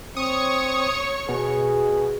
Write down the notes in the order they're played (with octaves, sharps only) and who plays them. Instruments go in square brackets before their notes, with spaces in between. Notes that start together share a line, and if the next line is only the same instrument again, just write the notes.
[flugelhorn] C4 [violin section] C#5 C#6 [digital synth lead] D#6
[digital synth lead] B2 [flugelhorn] G#4